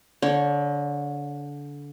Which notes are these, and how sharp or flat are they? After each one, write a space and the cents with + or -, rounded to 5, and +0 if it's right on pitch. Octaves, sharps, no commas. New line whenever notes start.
D3 -25 C#5 +0